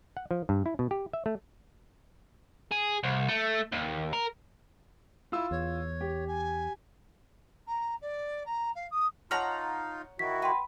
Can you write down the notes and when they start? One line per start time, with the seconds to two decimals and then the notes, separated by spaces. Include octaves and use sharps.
0.17 F#5
0.31 F3
0.49 G2
0.66 E4
0.79 B2
0.91 G4
1.13 E5
1.26 A3
2.72 G#4
3.04 C2
3.28 A3
3.72 D#2
4.13 A#4
5.32 E4 F4 E6
5.51 E2 C#5
6.01 G4
6.27 G#5
7.67 A#5
8.01 D5
8.46 A#5
8.75 F5
8.91 D#6
9.31 D#4 F4 C#5 F#5 A5 A#5 F6
10.19 D#3 E4 F#4 B6
10.42 B4 F#5 G5 C6